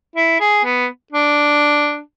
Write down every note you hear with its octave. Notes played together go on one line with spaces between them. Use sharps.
E4
G#4
B3
D4